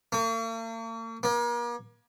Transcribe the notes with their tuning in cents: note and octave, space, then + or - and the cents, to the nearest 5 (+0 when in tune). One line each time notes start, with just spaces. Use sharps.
A#3 -45
A#3 +40